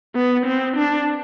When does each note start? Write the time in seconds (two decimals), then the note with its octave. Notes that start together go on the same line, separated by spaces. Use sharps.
0.15 B3
0.46 C4
0.76 D4